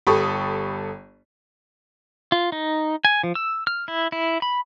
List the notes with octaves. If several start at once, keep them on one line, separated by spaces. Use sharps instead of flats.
G1 G4 A4 B5 C#6 D#6
F4
D#4
G#5
F3
E6
F6
E4
E4
B5